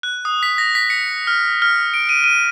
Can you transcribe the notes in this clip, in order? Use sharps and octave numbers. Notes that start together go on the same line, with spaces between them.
F#6
D#6
B6
A#6
B6
C#7
F6
F6
D7
D#7
D#7